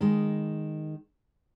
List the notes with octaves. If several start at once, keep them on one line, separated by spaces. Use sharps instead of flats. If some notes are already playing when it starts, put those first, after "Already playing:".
D#3 G#3